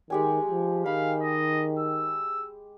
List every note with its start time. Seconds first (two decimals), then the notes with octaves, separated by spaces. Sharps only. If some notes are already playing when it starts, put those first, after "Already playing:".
0.10 D#3 G#3 G4 G#5
0.50 F3
0.86 D#3 F5 B5
1.22 D#5
1.79 E6